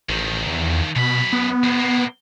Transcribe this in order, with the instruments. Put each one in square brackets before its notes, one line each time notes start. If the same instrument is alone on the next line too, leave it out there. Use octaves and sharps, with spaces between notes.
[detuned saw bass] A1 [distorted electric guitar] D#3 F3
[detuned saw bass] E2
[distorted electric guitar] F#2 B5 [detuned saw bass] B2
[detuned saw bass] B3
[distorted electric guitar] F2 C3
B2 A#3